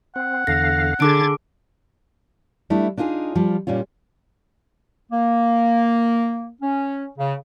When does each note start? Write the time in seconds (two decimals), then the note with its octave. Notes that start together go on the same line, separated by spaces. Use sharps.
0.16 C4 F#5
0.47 E2 D3 F5 A#6
1.00 D3 G#4 D6 G#6 A6 D7
2.70 G3 A3 D4 E4
2.97 D4 D#4 F4 G4 G#4
3.35 F3 G3 F4
3.67 A#2 G3 C#4 F4
5.12 A#3
6.62 C#4
7.18 C#3